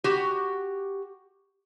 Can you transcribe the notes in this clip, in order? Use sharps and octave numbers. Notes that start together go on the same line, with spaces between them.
F#4 G4